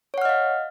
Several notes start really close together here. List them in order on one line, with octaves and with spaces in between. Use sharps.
C#5 F#5 F6 D#5 F5